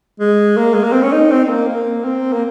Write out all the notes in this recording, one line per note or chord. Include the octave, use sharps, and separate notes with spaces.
G#3
A#3
G#3
A#3
C4
C#4
D#4
C4
C4
A#3
A#3
C4
A#3